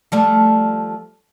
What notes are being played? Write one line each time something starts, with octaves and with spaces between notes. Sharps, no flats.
F3 G3 A3